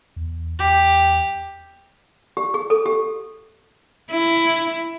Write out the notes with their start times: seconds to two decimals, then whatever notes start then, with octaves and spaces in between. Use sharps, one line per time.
0.16 E2
0.59 E2 G4
2.37 G4
2.54 G#4
2.70 A4
2.86 G4
4.11 E4